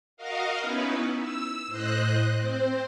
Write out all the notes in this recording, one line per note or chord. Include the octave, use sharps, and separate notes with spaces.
F#4 A#4 D#5 F5
B3 C#4 D#4 E4 B4
E6
A2 C5 D#5 F#6
C4 C5